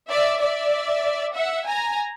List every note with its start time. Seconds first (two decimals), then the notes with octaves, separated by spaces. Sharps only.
0.09 D5 E5
0.40 D5 E5
1.34 E5 F#5
1.66 G#5 A#5